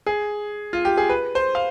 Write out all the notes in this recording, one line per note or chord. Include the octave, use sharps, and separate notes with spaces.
G#4
F4
G4
G#4
B4
C5
F5